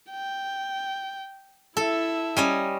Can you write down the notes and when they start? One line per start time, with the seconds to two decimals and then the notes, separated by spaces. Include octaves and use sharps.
0.11 G5
1.77 E4 A4 E5
2.37 G3 C#4 D#5